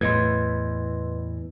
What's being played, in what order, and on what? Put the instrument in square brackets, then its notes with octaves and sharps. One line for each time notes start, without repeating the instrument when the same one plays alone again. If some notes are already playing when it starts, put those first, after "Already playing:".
[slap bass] E2 [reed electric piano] A2 G#6 [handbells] B4 D#5 C6